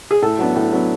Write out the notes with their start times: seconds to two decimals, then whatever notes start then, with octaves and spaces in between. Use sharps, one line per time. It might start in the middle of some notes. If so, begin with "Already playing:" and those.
0.11 G#4
0.22 A2 A4
0.38 F#3 B3 D4
0.56 A2
0.72 F#3 B3 D4